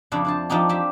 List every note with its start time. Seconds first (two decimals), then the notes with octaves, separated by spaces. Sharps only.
0.12 F2 C#3 D4 E4
0.25 D4 C5 A5
0.50 F3 D4 D#4 G4
0.69 C4 G4 E5